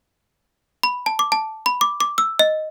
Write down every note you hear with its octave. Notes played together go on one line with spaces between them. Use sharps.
B5
A5
D6
A5
B5
D6
D6
E6
D#5